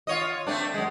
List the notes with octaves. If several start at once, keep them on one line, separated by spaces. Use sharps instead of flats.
F4 C#5 D#5
A3 C4 D4
F#2 G#3